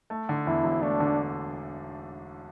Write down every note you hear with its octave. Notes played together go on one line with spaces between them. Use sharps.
A3
D3
E2 E4
E1
A3 D4
D3